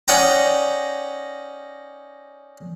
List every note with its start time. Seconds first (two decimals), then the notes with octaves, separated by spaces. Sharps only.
0.08 C#4 D#4 D5 F#5 G5 A#5